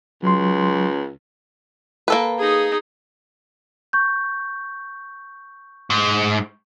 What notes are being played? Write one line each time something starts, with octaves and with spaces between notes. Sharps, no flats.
C#2 F#3 C6
A#3 A4 B4
D#4 G#4
C#6 G6
G#2